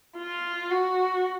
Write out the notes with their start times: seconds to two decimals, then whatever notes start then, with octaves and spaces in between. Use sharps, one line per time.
0.18 F4
0.71 F#4